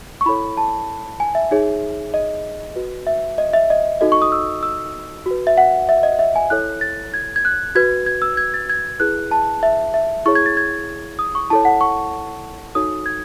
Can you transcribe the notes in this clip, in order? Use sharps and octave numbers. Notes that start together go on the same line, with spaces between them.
C#6
E4 A4 C#5 B5
A5
G#5
E5
D#4 G#4 C#5
D#5
F#4 B4
E5
D#5
E5
D#5
D#4 F#4 A4 D#5
C#6
D#6
E6
E6
F#4 B4
E5
F#5
E5
D#5
E5
G#5
E4 A4 C#5 F#6
A6
G#6
G#6
F#6
F#4 B4 G#6
G#6
E6
G#6
A6
G#6
E4 G#4 B4 F#6
A5
E5
E5
E4 G#4 C#5 C#6
G#6
A6
G#6
D#6
C#6
E4 A4 C#5 A5
F#5
C#6
D#4 F#4 A4 C#5 D#6
G#6